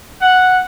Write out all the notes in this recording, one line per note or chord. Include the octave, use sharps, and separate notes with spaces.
F#5